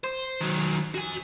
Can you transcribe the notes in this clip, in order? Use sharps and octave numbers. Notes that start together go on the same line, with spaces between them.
C5
D#3 F#3
F#4 G#5